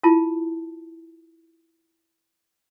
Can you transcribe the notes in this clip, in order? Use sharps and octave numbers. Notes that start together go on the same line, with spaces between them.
E4 F4 A5